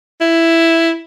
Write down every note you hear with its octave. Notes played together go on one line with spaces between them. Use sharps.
E4